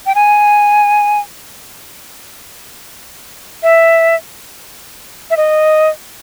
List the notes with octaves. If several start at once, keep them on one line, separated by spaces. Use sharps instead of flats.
G5
G#5
E5
E5
D#5